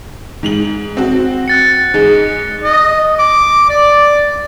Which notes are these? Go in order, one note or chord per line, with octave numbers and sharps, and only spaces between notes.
G#2 F7 F#7
C4 F#4
F#6 A6 C#7
G#2 G#3
D#5
D6
D5